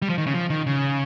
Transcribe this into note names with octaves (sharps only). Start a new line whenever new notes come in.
G3
F3
D#3
C#3
F3
D#3
C#3